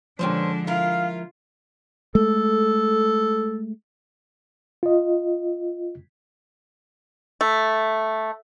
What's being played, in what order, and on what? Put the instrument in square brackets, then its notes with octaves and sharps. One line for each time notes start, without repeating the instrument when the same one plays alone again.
[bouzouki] A#2 C#4 C5 [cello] D3 D4 [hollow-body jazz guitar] F3 G#3 G5
[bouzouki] E4 A#4 [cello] F4 [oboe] F5
[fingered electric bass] G#3 A3 [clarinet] A4
[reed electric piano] F4 D#5
[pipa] A3